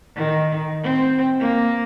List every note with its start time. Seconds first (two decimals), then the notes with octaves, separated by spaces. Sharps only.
0.16 D#3
0.83 C4
1.40 A#3